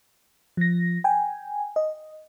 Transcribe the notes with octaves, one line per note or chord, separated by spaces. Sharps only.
F3 A#6
G5 G#5
D#5